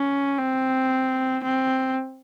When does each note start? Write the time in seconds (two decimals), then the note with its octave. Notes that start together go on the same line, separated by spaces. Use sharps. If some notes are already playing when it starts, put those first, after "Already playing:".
Already playing: C#4
0.39 C4
1.44 C4